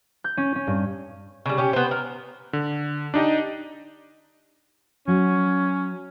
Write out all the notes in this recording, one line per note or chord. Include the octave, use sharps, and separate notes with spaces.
G6
C#4
C#4
G2
C#3 G3
C#4 G4
B3 C5
A#4
D3
D4 D#4 G4 D#5
F#3 C#4